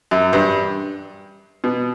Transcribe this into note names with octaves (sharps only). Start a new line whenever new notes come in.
F#2
G2
B2